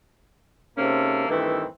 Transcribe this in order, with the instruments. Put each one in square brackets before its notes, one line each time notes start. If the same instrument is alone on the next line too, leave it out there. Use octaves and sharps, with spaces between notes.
[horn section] G#2 C3 A#3 C#4 A4
G2 D#3 E3 A3 C4